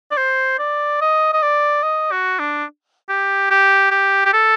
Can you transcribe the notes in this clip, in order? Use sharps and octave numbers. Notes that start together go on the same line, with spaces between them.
D5
C5
D5
D#5
D#5
D5
D#5
F#4
D4
G4
G4
G4
G4
A4